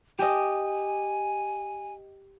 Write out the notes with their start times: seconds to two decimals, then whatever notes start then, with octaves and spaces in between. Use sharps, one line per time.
0.19 G4 D#5 G#5